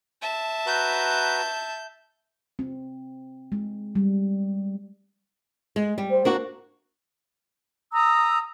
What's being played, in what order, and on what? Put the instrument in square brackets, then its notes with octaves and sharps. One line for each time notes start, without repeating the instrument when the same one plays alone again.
[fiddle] E5 A5
[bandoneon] F#4 B4 A#5 [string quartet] G6
[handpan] C4
G#3
G3
[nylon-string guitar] G#3
G3
[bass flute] C5
[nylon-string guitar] A#3 D4 F#4
[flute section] A#5 D#6 E6